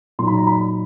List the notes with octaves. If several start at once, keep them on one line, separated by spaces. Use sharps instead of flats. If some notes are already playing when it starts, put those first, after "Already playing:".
A#2 F#3 A#3 D#4 C6
B5
A#5
B5